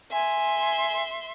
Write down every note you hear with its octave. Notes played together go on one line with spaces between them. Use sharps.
E5 G#5 C6